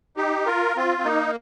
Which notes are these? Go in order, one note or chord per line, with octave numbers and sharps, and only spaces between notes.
D#4 G4
F4 A#4
C4 F4
C4
A#3 D#4